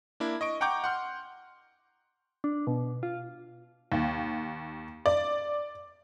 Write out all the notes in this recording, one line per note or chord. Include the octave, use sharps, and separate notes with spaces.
A#3 D4 E4
D#5 C#6 D7
F#5 G5 A#5 C#6 D6 G6
F#5 C6 F6
D4
B2
F4
D#2
D5